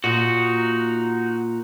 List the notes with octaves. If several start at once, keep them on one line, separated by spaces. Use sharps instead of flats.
A#2 D#4 F#4